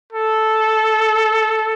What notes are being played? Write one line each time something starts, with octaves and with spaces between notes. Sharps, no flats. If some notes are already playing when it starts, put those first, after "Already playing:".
A4